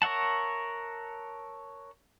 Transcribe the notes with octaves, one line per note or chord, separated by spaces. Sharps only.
A#4 C#5 E5 F#5 A5